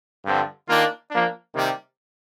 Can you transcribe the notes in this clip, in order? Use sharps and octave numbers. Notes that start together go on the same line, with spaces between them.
G2 D3 F3 C4
D#3 A#3 D4 F4
F3 A#3 D4
C3 D#3 G3 A#3